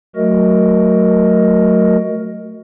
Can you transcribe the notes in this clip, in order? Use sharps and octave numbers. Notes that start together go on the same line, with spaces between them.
F#3 A3 F#4 A#4 D#5